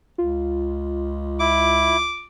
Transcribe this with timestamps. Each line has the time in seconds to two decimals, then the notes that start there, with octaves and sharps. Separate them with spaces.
0.18 C#2 F4
1.40 E4 D6